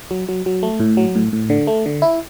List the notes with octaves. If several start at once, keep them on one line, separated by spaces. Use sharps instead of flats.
F#3
F#3
F#3
A3
A2
F#3
A2
A2
D3
A3
D3
E4